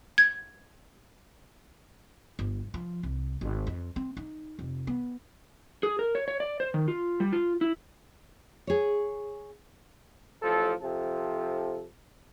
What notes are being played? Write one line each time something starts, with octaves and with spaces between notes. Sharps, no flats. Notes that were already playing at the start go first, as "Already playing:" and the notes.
G#6
G1
F3
C2
G#1
F2
C4
D#4
F1
B3
G#4
A#4
C#5
C#5
D5
C5
D#3
F4
G3
F4
E4
G#4 C#5
A1 F3 A4
C3 F3 A4